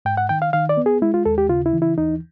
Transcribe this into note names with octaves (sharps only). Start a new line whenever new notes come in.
G#2 G5
F#5
D#3 G5
F5
D#3 F5
D5
B3
G#4
G#3 E4
F4
D#2 A4
G4
C#3 F4
E4
E3
E4
D#2 D#4